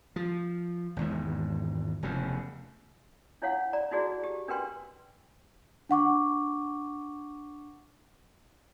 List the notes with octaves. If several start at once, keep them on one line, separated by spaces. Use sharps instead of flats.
F3
G#1 E2 G#2
F1 E2 C#3
D4 E4 C#5 F5 F#5
D5 A#5
D#4 E4 F#4 G#4 D5
G4
D4 A#4 B4 G5 C6
D4 F#5 C#6 D6